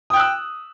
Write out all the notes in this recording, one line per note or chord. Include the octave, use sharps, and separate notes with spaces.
G5 D#6 E6 F#6